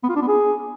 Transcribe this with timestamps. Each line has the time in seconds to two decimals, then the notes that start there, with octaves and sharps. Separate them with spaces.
0.03 B3
0.10 F4
0.16 D4
0.22 B3
0.28 G#4